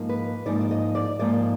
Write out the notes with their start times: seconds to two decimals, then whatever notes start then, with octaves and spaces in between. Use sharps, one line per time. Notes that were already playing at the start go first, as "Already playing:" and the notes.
Already playing: G#2 F3 A#3 D#4
0.09 B4
0.46 G#2 F3 A#3 D#4 D5
0.61 D5
0.71 D#5
0.95 D5
1.19 G#2 F3 A#3 D#4 D5